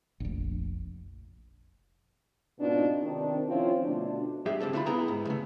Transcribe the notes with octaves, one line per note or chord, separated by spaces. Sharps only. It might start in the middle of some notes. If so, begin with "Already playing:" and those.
F1 A#1
G#2 B2 C4 D4 D#4 F4
C3 D#3 C4 D4
F3 C4 C#4 E4 F4
B2 D3 A3 D4
G2 G4 G#4 E5
C#2 A2 C4 A4
D3 A3 E4 F4 B5
B3 E4 G#4 G5 A#5 B5
G#2
C#3 A3